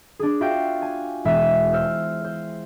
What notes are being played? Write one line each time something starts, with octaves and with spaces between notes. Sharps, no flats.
D4 G#4
F4 F#4 E5 F5 G5
G#5
E1 G#3 E5 D#7
C5 E6 F6
C5